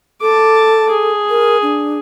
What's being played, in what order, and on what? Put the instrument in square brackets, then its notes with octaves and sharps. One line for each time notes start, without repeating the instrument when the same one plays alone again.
[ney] A4 [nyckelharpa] A5 D6
[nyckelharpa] G#4
[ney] A#4
D4